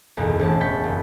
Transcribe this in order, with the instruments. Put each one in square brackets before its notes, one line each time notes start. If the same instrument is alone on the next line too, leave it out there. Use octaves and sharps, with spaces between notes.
[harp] F#1 B1 E2
E1 A1 A5
G5 B5 C#6 A6 B6
F#1